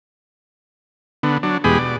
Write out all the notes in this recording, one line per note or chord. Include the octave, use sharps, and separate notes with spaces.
D3 B3
F#3 D4
E2 B2 G#3 G4 G#4 B5
B2 D5